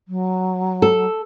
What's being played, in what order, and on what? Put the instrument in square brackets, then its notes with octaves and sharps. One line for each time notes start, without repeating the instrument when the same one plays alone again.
[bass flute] F#3
[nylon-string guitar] A4